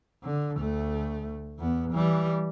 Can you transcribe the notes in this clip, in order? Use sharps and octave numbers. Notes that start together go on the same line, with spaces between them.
D3
D2 A3
E2 B3
E3 G3